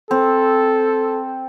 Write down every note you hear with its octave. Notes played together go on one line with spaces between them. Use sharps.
C4 A4